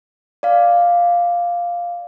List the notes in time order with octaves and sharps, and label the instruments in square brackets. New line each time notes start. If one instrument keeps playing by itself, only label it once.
[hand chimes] D5 F5